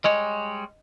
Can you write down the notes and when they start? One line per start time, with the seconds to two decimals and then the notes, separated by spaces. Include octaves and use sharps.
0.04 G3 G#3 C#5 D#5